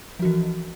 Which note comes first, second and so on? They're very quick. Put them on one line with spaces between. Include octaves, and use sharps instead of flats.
F3 F#4 E3